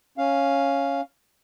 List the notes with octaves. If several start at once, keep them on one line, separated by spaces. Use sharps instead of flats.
C#4 F5